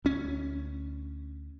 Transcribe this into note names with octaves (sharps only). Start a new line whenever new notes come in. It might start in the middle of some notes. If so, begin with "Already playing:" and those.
D2 C#4